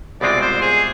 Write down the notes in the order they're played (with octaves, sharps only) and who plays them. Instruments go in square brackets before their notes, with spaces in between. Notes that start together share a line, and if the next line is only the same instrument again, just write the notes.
[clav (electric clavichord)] C2 B2 G#3 C4 F4 [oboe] D5
[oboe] C5
G#4